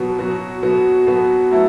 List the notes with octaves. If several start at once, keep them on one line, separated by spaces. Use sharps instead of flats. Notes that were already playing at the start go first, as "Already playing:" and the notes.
Already playing: B2 F#3 B3 F#4
B2 F#3 B3 F#4
B2 F#3 B3 F#4
B2 F#3 B3 F#4
F#3 A3 E4 A4